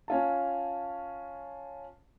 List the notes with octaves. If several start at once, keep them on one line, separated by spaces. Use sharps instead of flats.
C#4 F4 A5